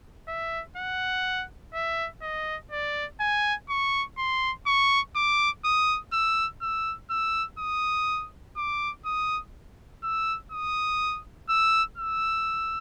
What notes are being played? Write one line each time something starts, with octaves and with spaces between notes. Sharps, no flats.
E5
F#5
E5
D#5
D5
G#5
C#6
C6
C#6
D6
D#6
E6
E6
E6
D#6
D6
D#6
E6
D#6
E6
E6